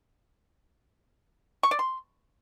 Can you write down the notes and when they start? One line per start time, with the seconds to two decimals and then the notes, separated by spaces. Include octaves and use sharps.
1.63 C#6
1.71 D5
1.79 C6